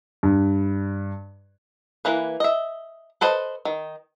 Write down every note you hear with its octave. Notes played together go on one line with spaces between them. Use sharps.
G2
E3 A#3 B4
D#5 E5
A4 B4 C5 D#5
D#3